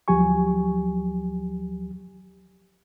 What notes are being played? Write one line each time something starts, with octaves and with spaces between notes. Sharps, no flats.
D2 F3 F#3 G4 G#5 C#6